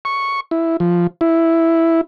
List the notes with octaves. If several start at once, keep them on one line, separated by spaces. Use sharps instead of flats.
C#6
E4
F3
E4